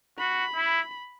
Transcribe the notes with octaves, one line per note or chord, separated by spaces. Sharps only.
F#4 B5
E4